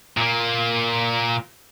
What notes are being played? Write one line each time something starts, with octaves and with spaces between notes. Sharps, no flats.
A#2 A#3